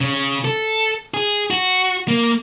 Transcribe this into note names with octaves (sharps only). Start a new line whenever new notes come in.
C#3
A4
G#4
F#4
A#3